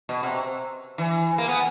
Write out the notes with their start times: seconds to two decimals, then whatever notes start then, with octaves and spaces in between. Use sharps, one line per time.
0.09 B2
0.23 C3
0.98 E3
1.38 A#3
1.48 B3